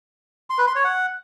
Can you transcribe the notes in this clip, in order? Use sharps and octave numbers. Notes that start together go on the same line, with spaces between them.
C6
B4
C6
C#5
F#5